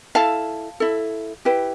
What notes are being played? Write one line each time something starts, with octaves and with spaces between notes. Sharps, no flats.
E4 A4 F5 A5
E4 A4
E4 G4 B4